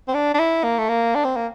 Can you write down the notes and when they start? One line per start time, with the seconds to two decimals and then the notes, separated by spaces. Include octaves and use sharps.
0.08 C4
0.14 D4
0.34 D4
0.39 E4
0.64 A#3
0.78 A3
0.89 A#3
1.15 D4
1.24 C4
1.36 A#3